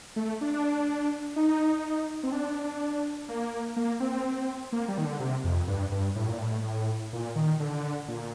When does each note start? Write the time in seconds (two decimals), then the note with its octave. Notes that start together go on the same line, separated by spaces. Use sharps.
0.16 A3
0.41 D4
1.36 D#4
2.23 C4
2.32 D4
3.28 A#3
3.76 A#3
4.00 C4
4.72 A#3
4.88 G3
4.98 D#3
5.05 D3
5.20 C3
5.44 F2
5.68 G2
5.92 G2
6.16 A2
6.28 A#2
6.40 A2
7.13 A#2
7.36 D#3
7.60 D3
8.08 A#2